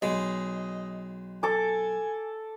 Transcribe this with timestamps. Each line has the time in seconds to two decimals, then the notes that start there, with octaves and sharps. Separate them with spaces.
0.02 B1 G#3 D#5
1.43 A4 G#5 D6